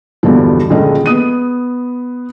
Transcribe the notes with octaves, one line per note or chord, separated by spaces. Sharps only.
E2 G2 B2 D3 F3
D#1 C#2 D3 F3 G#3 D#5
B3 D#6 D#7